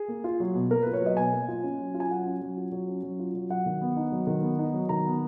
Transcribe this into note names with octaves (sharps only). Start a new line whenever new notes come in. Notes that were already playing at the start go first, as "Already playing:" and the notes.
Already playing: G#4
A#3
F4
F#3
B2
A#3 A#4
F4 B4
C#5
F#3 D#5
B2 G#5
A#3
F4
C#4
F#3
F4
G#5
F#3 F#5
C#4
F#3
F4
F#3
C#4
F#3
F4
F#3
F#3 F#5
D#3
B3
D#4
F#3
D#3
B3
D#4
F#3
D#3 A#5
B3